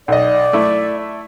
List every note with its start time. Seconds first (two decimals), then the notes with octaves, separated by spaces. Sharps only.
0.08 B1 D5 D#5
0.53 A3 E4